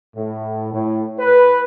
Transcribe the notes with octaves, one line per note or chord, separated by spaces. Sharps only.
A2
A2
B4